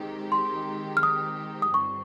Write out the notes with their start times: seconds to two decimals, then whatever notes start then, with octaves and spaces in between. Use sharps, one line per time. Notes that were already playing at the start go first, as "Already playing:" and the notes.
Already playing: D#3 G#3 C4 D#4 G4
0.32 C6
0.97 F6
1.03 D#6
1.62 D#6
1.73 G1 G2 D#3 G3 C4 C#6